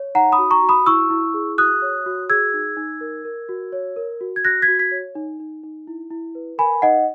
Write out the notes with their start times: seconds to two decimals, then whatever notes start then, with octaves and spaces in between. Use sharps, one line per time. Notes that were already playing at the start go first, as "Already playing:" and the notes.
Already playing: C#5
0.15 D#4 F#5 A#5
0.32 B5 D#6
0.38 F#4
0.51 A#5 C#6
0.63 F#4
0.69 B5 D#6
0.86 E4 C#6 E6
1.10 E4
1.34 G#4
1.58 F#4 D#6 F#6
1.82 C#5
2.06 F#4
2.30 G#4 E6 G#6
2.54 D#4
2.77 D#4
3.01 A#4
3.25 A#4
3.49 F#4
3.72 C#5
3.96 A#4
4.21 F#4
4.36 G#6
4.44 F#4 F#6 A#6
4.62 G#6 B6
4.68 F#4
4.79 G#6 B6
4.91 C#5
5.15 D#4
5.40 D#4
5.63 D#4
5.87 E4
6.10 E4
6.35 B4
6.58 A#4 G#5 B5
6.82 D#4 D#5 F#5